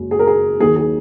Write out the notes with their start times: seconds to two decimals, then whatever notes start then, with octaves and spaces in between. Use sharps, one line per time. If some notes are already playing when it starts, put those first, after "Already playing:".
Already playing: F#1 F#2 C#3 G#3
0.11 G#4
0.19 A#4
0.27 G#4
0.60 D#2 D#3 F#3 G#4
0.76 G#4